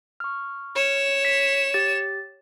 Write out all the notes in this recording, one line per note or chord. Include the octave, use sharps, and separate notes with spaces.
C#6 F6
C#5 E7
B6
G4 A6